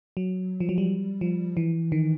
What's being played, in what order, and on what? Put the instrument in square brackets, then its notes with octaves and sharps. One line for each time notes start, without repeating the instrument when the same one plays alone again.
[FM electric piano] F#3
F3
F#3
G3
F3
E3
D#3